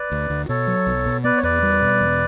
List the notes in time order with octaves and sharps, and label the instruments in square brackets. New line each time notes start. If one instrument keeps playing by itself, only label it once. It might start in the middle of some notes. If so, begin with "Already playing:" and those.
Already playing: [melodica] B4 D5
[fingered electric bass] D2
D2
[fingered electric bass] B2 [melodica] A4 C#5
[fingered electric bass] F#3
B1
B2
[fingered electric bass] B3 [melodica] B4 D5
[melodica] C#5
[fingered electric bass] E2 [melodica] B4 D5
[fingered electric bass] G3
B2
E2